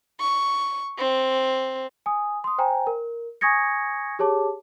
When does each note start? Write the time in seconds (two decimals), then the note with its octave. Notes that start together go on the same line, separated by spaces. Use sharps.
0.20 C#6
0.98 C4
2.06 G#5 D#6
2.44 C6 D#6
2.58 C5 G5 G#5 A#5
2.87 A#4
3.41 G#5 C#6 D#6 G#6 A#6 C#7
4.19 G4 G#4 C#5 A5 D6